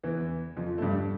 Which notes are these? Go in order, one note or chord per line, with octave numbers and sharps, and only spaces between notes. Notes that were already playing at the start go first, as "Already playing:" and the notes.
E2 E3
F2 F3
A3
G2 G3